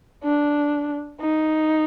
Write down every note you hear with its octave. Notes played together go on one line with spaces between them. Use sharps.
D4
D#4